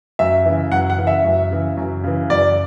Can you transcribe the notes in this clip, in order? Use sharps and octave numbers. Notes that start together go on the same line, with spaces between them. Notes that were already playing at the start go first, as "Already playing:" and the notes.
F#2 E5
C#3 E3
F#2 F#5
F#5
C#3 E3
E5
F#2
C#3 E3
F#2
C#3 E3
F#2 D5